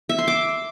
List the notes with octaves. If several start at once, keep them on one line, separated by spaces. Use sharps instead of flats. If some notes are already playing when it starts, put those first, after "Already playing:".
E5
C6
D6